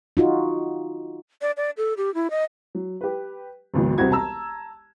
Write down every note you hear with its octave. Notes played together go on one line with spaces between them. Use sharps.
D#4 F4 F#4
D5
D5
A4
G4
E4
D#5
F#3
G4 B4
G#1 C#2 B2 F#3
E1 C2 G3 C4 F#4 G#6
A5 A#5 E6